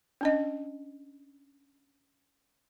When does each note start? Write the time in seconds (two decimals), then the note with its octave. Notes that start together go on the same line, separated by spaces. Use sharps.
0.21 C#4 D4 D#5